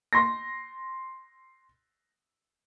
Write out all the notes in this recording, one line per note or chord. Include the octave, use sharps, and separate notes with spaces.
C6 A#6